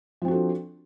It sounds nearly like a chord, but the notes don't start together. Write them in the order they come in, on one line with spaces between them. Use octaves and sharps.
F3 C4 F#4 A4 D4